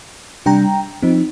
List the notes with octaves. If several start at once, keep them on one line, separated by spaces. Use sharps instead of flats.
C3 G3 D4 G5 A#5
F3 C4 D#4